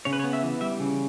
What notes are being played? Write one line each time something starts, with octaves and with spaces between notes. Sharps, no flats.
C#3 C#5
B4
C#5
B3
E5
E3
G3 E5
C#3